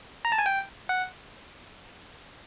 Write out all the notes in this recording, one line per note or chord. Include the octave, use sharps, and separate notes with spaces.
A#5
A5
G#5
G5
F#5